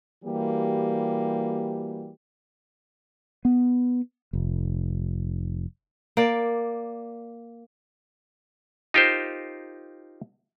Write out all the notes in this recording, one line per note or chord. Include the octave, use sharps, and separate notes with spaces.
E3 G3 A#3 F#4 G4
B3
F1
A#3 D5
D#4 F4 G4 A#4 C5